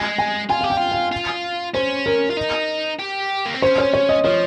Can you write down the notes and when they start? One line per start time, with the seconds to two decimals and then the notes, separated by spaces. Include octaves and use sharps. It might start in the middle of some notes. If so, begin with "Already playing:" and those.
Already playing: G#3 G#5
0.18 G#5
0.49 F4 G#5
0.61 G4 F5
0.70 G5
0.77 F4
0.92 F5
1.12 F4
1.74 C#4 C5
2.06 A#4
2.31 F4
2.37 D#4
3.00 G4
3.46 A#3
3.54 C4
3.62 C#4 C5
3.78 C#5
3.93 C#5
4.09 D#5
4.24 F3 C#5